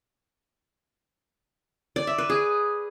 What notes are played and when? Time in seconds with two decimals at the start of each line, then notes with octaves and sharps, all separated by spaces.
1.96 D5
2.07 E5
2.18 B4
2.30 G#4